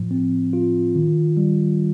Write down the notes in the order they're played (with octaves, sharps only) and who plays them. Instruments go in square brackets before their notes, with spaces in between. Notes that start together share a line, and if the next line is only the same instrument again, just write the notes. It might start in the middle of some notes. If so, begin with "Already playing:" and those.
Already playing: [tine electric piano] A2 F3
C4
F4
D#3
G3